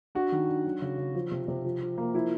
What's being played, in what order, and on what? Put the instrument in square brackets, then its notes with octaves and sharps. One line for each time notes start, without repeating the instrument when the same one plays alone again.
[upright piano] D4 [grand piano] F#4
[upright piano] D#3
D4
F#3
C#3
C#3
F3
C3
C3
F3
F3
A#3
[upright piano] F3 [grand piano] E4